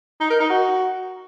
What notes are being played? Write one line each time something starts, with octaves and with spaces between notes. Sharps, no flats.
D#4
A#4
D#4
F#4